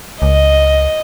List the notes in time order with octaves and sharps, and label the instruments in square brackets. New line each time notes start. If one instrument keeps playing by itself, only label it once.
[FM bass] C#2 [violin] D#5